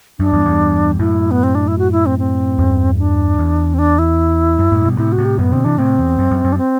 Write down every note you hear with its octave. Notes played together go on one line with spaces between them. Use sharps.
F#2 D4
E2 G2
E2 G2
F#2 A2 E4
B3
C4
D4
E4
F#4
E4
C4
C4
E2 G2
D4
E2
C4
D4
E4
F#2
F#2 A2
G2 B2
A2 C3 E4
F#4
A2 C3
G4
F#2 A2 B3
B2 D3 C4
C3 E3 D4
A2 C3 C4
E2
F#2
F#2
F#2
D4
C4